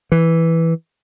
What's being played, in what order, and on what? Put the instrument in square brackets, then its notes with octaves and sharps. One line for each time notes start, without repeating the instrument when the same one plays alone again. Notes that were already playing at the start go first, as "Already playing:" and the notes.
[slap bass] E3